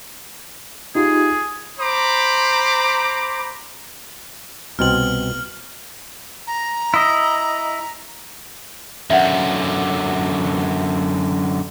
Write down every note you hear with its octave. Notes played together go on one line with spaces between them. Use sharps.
D#4 F4 G4 G#4
C5 A#5 B5 D6
C2 B2 C4 F6 F#7
A#5
E4 D#5
F#2 D3 E5 F#5